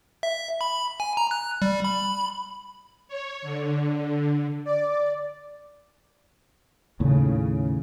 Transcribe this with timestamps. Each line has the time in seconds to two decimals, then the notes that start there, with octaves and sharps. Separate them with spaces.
0.23 E5
0.61 B5
1.00 G#5
1.17 A#5
1.31 F#6
1.62 G3
1.84 B5
3.08 C#5
3.42 D3
4.65 D5
7.00 D#2 A2 C#3